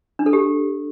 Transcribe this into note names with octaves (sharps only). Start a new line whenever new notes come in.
D4
A4
G4